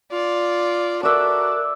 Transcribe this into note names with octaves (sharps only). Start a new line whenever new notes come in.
F4 D5
F#4 A4 A#4 D5 E5 D6 F#6